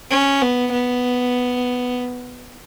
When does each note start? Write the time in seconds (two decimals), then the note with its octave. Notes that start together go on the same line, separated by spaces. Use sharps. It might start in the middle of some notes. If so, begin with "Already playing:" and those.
0.11 C#4
0.42 B3
0.72 B3